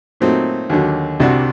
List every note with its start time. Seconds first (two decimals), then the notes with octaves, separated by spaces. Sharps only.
0.20 A#2 F#3 A3 C4 D#4
0.70 D#2 D3 F#3
1.20 C2 C3 G3 D4 F#4